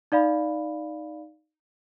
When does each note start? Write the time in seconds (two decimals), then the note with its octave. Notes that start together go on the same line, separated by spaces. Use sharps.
0.12 D#4 D5 F5 B5